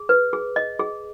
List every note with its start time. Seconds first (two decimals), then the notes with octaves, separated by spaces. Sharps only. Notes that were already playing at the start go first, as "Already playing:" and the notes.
Already playing: G#4
0.09 B4
0.33 G#4
0.56 D#5
0.79 G#4